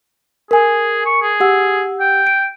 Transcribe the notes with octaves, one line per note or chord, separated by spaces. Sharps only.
G#4 A#4 G#5
C#6
G#4
G4 F#5 E6
G5
D7